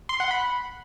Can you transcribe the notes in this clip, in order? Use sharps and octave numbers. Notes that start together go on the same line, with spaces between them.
C6
F#5
B5